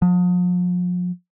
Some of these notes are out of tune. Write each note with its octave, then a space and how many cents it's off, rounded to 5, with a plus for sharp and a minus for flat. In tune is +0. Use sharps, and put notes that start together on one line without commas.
F3 +40